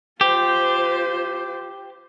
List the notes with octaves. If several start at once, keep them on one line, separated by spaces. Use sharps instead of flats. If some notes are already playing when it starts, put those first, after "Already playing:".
F4 G4 C5